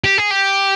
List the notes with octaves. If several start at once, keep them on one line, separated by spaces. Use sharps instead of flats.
G4
G#4
G4